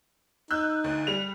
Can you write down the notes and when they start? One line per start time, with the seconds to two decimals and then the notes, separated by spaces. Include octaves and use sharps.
0.51 D#4 E6 F#6 G6
0.84 D2
1.07 G3 F7